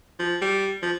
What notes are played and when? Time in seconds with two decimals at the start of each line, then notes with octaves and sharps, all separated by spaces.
0.19 F3
0.42 G3
0.82 F3